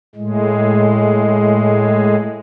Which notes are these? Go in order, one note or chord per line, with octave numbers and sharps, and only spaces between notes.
A2 G#3